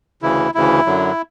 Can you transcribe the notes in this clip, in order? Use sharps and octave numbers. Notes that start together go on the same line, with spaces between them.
D2 C#3 E3 E4
D2 C#3 E3 E4
F#2 D3 F#3